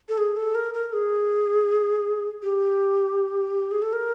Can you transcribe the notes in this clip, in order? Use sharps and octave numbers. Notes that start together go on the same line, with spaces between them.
A4
G#4
A4
A#4
A#4
G#4
G4
G#4
A4
A#4